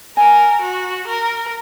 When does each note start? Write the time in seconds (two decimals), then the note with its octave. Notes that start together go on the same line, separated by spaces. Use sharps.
0.17 A#4 G#5
0.62 F#4
1.08 A#4